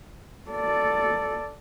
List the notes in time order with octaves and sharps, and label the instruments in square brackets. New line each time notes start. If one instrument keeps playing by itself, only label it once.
[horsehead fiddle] A4 D5